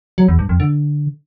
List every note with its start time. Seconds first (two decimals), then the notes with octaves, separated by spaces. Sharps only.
0.18 F#3
0.28 E2
0.39 G2
0.49 F2
0.60 D3